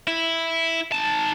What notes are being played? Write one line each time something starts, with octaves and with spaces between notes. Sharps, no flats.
E4
D#4 A5